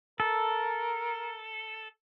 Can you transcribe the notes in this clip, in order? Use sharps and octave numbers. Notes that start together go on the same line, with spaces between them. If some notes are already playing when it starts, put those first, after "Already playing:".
A4 A#4